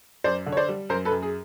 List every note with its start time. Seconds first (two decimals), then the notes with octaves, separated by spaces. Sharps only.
0.24 F#2 C5 D5
0.46 D3
0.52 C#5
0.57 C5 D5
0.69 G3
0.89 F#2 A#4 C5
1.05 A4 B4
1.11 F#2
1.22 G#4